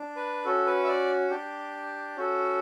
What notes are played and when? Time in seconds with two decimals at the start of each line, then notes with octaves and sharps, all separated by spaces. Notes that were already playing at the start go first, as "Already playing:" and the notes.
Already playing: D4
0.16 B4
0.44 C#4 F#4 A4
0.66 B4
0.84 E5
0.88 D5
1.30 D4 G4
2.16 C#4 F#4 A4